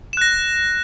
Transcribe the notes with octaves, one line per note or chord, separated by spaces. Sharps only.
F#6 A#6 E7